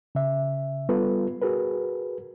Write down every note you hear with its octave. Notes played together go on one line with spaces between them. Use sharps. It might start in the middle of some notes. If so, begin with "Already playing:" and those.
C#3 E5
G3 B3 F4 A4 B4
F#4 G#4 A#4 B4